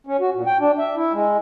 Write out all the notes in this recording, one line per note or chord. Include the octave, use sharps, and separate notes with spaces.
C#4
F#4
A#2
G5
D4
E5
E4
G#3